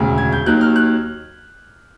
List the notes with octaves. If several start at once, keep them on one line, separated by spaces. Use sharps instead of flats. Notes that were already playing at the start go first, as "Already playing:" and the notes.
Already playing: E1 D2 C#3
G#6
G6
D#2 D#3 F#3 F#6
F6
F#6